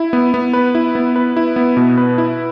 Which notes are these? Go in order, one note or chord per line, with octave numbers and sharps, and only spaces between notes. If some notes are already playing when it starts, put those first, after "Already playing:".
Already playing: E4
B3
B3
B4
E4
B3
B4
E4
B3
B2
B4
E4